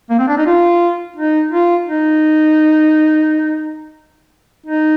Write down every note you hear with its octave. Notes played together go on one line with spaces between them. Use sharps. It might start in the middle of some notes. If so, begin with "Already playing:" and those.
A#3
C4
D4
D#4
F4
D#4
F4
D#4
D#4